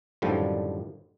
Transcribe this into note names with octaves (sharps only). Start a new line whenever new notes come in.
F#2 A2 D3 D#3 F3 G3